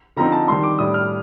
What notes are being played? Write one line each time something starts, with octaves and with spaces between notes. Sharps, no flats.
D3 F3 C4 D#4 A#5
A5
D#3 G3 D4 C6
D6
A2 G3 D4 D#6
F6